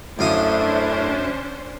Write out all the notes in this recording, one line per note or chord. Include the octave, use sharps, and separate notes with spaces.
F#2 A3 C#4 D4 E4 C5 F5 D#6